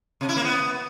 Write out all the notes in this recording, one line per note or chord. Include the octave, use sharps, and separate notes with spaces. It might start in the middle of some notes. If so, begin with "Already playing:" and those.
C3
E4
A#3
B3